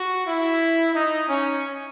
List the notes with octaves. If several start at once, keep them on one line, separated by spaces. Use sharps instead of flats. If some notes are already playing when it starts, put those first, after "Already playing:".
Already playing: F#4
E4
D#4
C#4